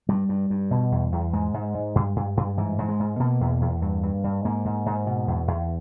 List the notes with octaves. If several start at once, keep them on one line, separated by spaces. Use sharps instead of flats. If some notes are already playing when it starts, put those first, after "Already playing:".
G2 G3
G2
G2
B2
E2
E2
G#2 G#3
G#2
G#2
G2
G2
G2
G#2 E3
G#2
G#3
G#2
B2 A#3
E2
E2
G2
G2
G2
G#2 A#3
G#2
G#2
B2
E2
E2